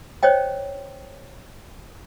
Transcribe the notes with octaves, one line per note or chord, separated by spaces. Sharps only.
C5 C#5 D#5 G5